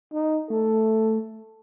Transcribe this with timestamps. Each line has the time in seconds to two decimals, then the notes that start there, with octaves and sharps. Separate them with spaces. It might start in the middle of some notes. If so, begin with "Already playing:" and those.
0.13 D#4
0.50 A3 A4